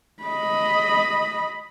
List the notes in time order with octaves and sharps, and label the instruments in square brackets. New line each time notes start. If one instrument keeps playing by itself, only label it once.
[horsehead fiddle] D#5 B5